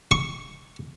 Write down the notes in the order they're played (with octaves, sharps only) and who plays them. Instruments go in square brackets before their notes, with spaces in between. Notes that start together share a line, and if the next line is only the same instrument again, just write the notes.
[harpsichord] C#6